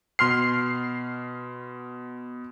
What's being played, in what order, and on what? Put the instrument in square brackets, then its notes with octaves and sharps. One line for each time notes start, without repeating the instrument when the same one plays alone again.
[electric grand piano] B2 C6 F6 C7